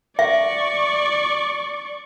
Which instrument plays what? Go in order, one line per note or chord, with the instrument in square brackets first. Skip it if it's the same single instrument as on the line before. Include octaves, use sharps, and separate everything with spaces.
[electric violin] D5 C#6 [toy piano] E5